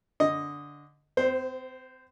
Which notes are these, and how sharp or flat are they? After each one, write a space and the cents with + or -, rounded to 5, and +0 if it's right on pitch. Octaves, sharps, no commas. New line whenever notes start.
D3 -10 D#5 +0
C4 -35 C5 +0